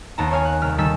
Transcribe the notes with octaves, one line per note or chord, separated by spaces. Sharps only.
D#2 D#3 B3 A5 A#5
C#5 F5 G#5
F#6
C2 F6 B6
D#3 G3 A4 G#5 E6 B6